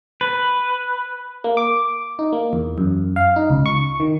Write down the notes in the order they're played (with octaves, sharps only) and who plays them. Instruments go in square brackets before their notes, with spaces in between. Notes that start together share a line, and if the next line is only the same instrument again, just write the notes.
[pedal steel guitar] B4
[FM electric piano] A#3
D6
D#4
A#3
E2
F#2
F5
D#4
C#2
C#6
D#3